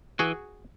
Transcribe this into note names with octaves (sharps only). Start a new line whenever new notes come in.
E3 F#4 G#4